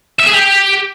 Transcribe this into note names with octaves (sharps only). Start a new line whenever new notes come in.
E5
G#4
G4